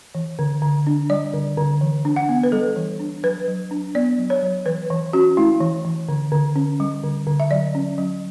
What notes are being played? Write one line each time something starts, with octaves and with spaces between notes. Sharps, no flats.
E3
D3
D3
D4
G3 D5
D3
D3
E3
D4
F#5
B3
B4
G3 A4
E3
D4
F#3 B4
F#3
D4
B3 D5
F#3
C#5
F#3
E3 B4
E3
C#4 F#4
A3 E4
E3
E3
D3
D3
C#4
G3
D3
D3
E5
F#3 D5
C#4
F#3